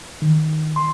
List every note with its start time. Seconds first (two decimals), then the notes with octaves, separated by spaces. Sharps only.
0.22 D#3
0.76 C6